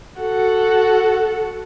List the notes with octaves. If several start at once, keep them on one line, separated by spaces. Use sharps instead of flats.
F#4 A4